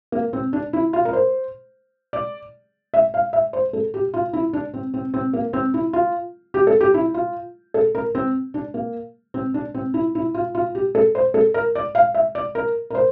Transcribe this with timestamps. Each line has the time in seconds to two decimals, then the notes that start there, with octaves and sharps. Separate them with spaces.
0.12 A#3
0.33 C4
0.53 D4
0.73 E4
0.93 F4
1.05 A#4
1.13 C5
2.13 D5
2.94 E5
3.14 F5
3.33 E5
3.53 C5
3.73 A4
3.94 G4
4.14 F4
4.33 E4
4.53 D4
4.74 C4
4.94 C4
5.14 C4
5.33 A#3
5.53 C4
5.74 E4
5.93 F4
6.54 G4
6.67 A4
6.81 G4
6.94 E4
7.14 F4
7.74 A4
7.95 A#4
8.15 C4
8.54 D4
8.74 A#3
9.34 C4
9.54 D4
9.74 C4
9.94 E4
10.15 E4
10.34 F4
10.55 F4
10.75 G4
10.95 A4
11.15 C5
11.34 A4
11.54 A#4
11.75 D5
11.95 F5
12.14 E5
12.35 D5
12.55 A#4
12.90 A#4
12.95 C5